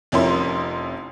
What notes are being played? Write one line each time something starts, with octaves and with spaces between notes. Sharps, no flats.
F1 F2 C#4 E4 A#4 C6